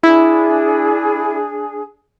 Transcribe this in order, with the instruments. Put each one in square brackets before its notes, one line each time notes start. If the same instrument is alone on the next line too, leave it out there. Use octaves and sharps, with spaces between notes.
[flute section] D4 G#4 [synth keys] E4